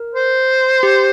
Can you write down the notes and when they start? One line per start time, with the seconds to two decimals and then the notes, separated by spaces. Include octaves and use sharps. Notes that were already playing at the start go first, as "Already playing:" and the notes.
Already playing: A#4
0.15 C5
0.83 G4